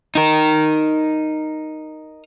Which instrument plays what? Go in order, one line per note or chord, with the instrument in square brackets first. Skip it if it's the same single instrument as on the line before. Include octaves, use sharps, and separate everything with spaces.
[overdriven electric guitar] D#4 A#4